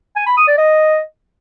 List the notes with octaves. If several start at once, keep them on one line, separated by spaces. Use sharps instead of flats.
G#5
B5
D#6
D5
D#5